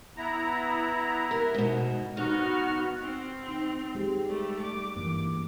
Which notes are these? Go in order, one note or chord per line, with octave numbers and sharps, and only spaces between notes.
B3 E4 A#5
A#4
G#2 B2
B3 D#4 F#4 F6
C4
D#4
G#3 G4
G3 A3
D6
G2 E3 A3 A#3